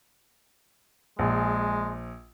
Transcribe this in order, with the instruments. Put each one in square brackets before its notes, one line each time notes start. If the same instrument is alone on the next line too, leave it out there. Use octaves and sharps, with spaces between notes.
[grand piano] A#1 [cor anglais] G#3